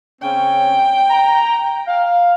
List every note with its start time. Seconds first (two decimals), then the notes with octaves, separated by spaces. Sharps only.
0.22 C#3 C4 C#4 G5
1.10 A#5
1.87 F5